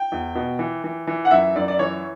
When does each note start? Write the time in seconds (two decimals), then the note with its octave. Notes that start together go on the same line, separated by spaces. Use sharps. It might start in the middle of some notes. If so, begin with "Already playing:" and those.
Already playing: G5
0.12 E2
0.35 B2
0.59 E3
0.84 E3
1.07 E3
1.25 F#5
1.31 F#2 E5
1.56 F#2 D5
1.68 D5
1.79 E3 C#5